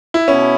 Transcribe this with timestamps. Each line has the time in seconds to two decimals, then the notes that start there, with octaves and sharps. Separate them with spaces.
0.14 E4
0.28 B2 B3 C#4 E4